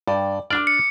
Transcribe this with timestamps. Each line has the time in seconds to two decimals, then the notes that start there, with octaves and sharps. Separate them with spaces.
0.08 G2 D5 G5
0.50 D4 D5 D6 F6
0.67 C#7